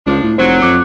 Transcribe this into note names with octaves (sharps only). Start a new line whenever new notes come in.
C#2 F3 D4
A2
F1 F#3 C5
F2 D6 F#6